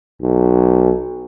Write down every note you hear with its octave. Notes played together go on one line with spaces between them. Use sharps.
B1